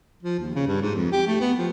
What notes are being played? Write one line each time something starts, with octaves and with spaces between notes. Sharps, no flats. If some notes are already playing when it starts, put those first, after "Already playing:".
F3
D#2
C#3
G2
G#2
F2
G4
A3
B3
F3